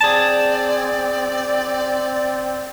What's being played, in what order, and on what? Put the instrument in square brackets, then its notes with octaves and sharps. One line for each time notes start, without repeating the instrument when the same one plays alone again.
[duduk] C4 [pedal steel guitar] G#4 A5 [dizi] D5